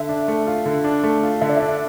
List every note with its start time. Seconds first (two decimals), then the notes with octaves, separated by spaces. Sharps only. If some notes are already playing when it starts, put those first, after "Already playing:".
Already playing: D3 E5
0.09 D4
0.28 A3
0.47 F4
0.66 D3
0.84 D4
1.04 A3
1.23 F4
1.41 D3 E5
1.49 D5
1.57 D4 E5